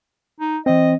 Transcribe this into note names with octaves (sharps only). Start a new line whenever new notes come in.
D#4
E3 C4 D#5